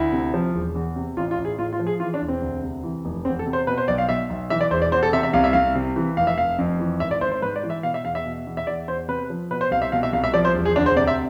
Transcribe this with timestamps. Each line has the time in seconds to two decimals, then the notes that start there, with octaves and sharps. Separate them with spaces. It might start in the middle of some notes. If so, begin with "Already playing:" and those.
Already playing: D2 E4
0.13 C3
0.34 F3
0.55 E1
0.75 E2
0.96 C3
1.17 A1 F4
1.31 F4
1.38 A1
1.45 G#4
1.59 A2 F4
1.73 F4
1.79 F3
1.87 G#4
2.00 E3 F4
2.14 D4
2.22 E1
2.28 C4
2.42 D2
2.63 C3
2.84 E3
3.05 F1
3.25 E2 C4
3.39 A4
3.46 C3
3.53 C5
3.67 B2 B4
3.78 C5
3.88 B1 D5
3.98 F5
4.09 B2 E5
4.30 B1
4.50 E3 E5
4.61 D5
4.71 E1 C5
4.82 D5
4.92 E2 C5
5.03 A4
5.13 C3 E5
5.23 E5
5.33 C2 F5
5.44 E5
5.53 C2 F5
5.75 C3
5.96 E3
6.17 F1 F5
6.27 E5
6.38 F1 F5
6.58 F2
6.80 E3
7.00 G#1 E5
7.11 D5
7.21 G#1 C5
7.32 C5
7.42 G#2 B4
7.56 D5
7.64 E3
7.70 E5
7.83 B2 F5
7.94 E5
8.05 E2 F5
8.15 E5
8.26 B2
8.47 E2
8.57 E5
8.67 E2 D5
8.88 E2 C5
9.08 C3 B4
9.30 F3
9.51 B2 B4
9.61 C5
9.71 C2 F5
9.82 E5
9.92 B2 F5
10.03 E5
10.13 C2 F5
10.24 E5
10.34 F3 D5
10.45 C5
10.55 E1
10.65 G#4
10.75 D2 D4
10.86 C5
10.96 C3 D5
11.07 E5